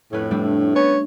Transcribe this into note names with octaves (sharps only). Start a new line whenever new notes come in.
F2 A2 C#4 B4
G3 A3 D4
B3 C#4 C#5